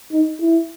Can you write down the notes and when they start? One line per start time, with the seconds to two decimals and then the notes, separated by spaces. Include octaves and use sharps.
0.12 D#4
0.41 E4